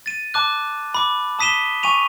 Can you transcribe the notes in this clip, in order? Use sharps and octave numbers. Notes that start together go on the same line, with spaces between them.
A6 D#7
A5 D6 F#6
B5 D6
A5 D#6 B6 D#7 E7 G7
G#5 C#6 D#7 F7